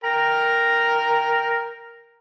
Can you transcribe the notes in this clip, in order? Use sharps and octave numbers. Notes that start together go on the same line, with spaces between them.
A#4 G5 A#5